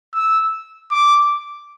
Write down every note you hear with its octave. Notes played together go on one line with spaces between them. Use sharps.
E6
D6